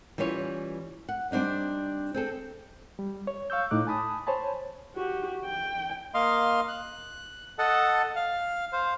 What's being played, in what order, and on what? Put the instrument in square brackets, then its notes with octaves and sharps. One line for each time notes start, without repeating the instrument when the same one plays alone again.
[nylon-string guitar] E3 G3 C#4 F4 C#5
F#5
G3 C4 D4 D#4 D5
C4 G#4 A4
[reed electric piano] G3
C#5
F5 C#6 E6 G6
A2 D#4 D6 F#6
G#5 A5 B5 D#6
C5 C#5 G#5 A5 B5
[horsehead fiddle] F#4 G4
G5
[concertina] A#3 D#5 F5 C6
F#6
A4 D#5 F#5 A5
F5
C5 F5